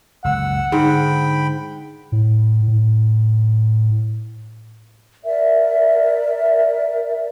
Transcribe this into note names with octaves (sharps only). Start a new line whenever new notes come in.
F#1 C#2 F#5 E6
G#2 D3 G5 B5
A2
A2
A#4 D5 E5